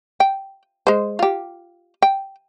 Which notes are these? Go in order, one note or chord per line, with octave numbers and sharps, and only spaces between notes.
G5
G#3 C5
F4 G4
G5